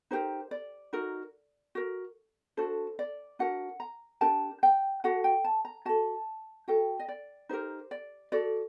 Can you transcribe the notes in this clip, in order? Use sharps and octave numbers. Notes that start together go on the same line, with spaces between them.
D#4 G4 A#4 C5
D5
D#4 F#4 A#4
F#4 A#4
D4 F#4 A4 C5
D5
D4 F#4 A#4 F#5
A#5
D4 G4 A#4 A5
G5
F#4 A4 F#5
G5
A5
A#5
F#4 A4 A5
F#4 A4 G5
D#5
D5
D#4 G4 A#4 C5
D5
F#4 A4 D5